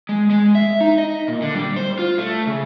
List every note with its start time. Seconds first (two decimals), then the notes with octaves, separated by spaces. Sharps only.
0.09 G#3
0.30 G#3
0.55 E5
0.81 D#4
0.98 D#5
1.28 A#2
1.42 D3
1.54 G3
1.76 C5
1.99 F4
2.18 A3
2.47 C#3